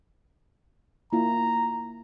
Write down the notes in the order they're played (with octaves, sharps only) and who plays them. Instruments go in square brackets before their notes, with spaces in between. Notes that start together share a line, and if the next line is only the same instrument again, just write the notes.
[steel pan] A#3 E4 F4 [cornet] A#5